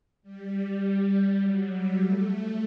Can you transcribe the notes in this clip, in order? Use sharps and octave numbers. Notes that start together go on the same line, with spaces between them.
G3
G3
F#3
G3
A3